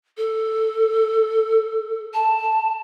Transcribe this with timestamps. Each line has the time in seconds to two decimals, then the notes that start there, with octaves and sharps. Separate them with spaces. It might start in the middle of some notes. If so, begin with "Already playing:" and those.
0.17 A4
2.14 A5